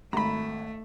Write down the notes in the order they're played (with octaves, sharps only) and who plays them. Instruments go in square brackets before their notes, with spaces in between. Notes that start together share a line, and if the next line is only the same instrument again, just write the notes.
[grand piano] G#1 [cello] A3 [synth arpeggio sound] A#5 B5